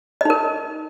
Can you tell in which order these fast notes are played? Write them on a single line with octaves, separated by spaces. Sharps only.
D#5 D#4 A#4